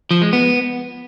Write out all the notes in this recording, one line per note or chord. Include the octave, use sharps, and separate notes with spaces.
F3
G#3
B3